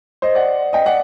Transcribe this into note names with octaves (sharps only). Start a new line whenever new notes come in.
C5 D#5
D5 F#5
D#5 G5
D5 F#5